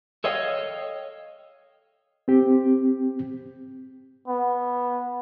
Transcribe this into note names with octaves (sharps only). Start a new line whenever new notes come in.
A4 C#5 D#5 F5 G5
C4 G4
B3